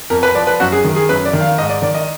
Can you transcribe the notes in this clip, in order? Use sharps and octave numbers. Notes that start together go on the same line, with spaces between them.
F2 A#4
B4
F3 D5
B4
F#2 F#4
G#4
D#3
G#4
F#2 B4
D5
D#3
F5
G#2 D#5
D5
D#3 D5
D#5